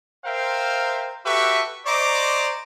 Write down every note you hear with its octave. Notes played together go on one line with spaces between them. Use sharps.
A#4 C5 E5 F5 G5
F#4 G4 A4 B4 E5 C#6
C5 D5 D#5 A#5 C#6 D6